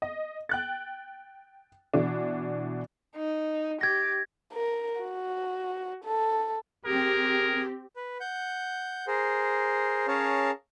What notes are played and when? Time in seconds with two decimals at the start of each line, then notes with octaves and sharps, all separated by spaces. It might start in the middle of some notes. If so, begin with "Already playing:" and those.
0.02 D#5
0.49 G5 F#6 A6
1.94 B2 E3 D4
3.16 D#4
3.81 G4 G#6 A#6
4.53 A#4
5.01 F#4
6.04 A4
6.85 C4 G4 G#4 A#4
7.95 B4
8.20 F#5 G6
9.07 G#4 A#4 C5
10.08 C#4 G#4 A#4 C#5 F5 A5